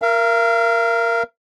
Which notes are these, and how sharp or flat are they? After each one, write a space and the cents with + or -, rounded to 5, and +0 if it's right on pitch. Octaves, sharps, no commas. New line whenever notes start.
A#4 +0 F5 -45